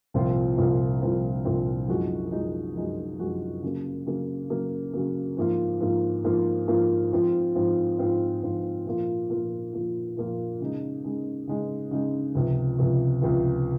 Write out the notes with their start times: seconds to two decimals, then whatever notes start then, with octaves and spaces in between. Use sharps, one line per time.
0.14 C2 A#2 F3 C4 F4
0.58 C2 A#2 F3 C4 F4
1.02 C2 A#2 F3 C4 F4
1.45 C2 A#2 F3 C4 F4
1.88 F#2 F3 G#3 D#4 F#4
2.32 F#2 F3 G#3 D#4 F#4
2.76 F#2 F3 G#3 D#4 F#4
3.19 F#2 F3 G#3 D#4 F#4
3.63 C#3 F#3 A#3
4.06 C#3 F#3 A#3
4.50 C#3 F#3 A#3
4.93 C#3 F#3 A#3
5.37 G#2 F3 A#3 F4
5.80 G#2 F3 A#3 F4
6.24 G#2 F3 A#3 F4
6.68 G#2 F3 A#3 F4
7.12 G#2 F3 C4 F4
7.55 G#2 F3 C4 F4
7.99 G#2 F3 C4 F4
8.42 G#2 F3 C4 F4
8.86 A#2 F3 A#3 F4
9.30 A#2 F3 A#3 F4
9.73 A#2 F3 A#3 F4
10.17 A#2 F3 A#3 F4
10.60 C#3 G#3 D#4
11.04 C#3 G#3 D#4
11.48 C#3 G#3 D#4
11.91 C#3 G#3 D#4
12.35 C#2 C3 F3
12.78 C#2 C3 F3
13.22 C#2 C3 F3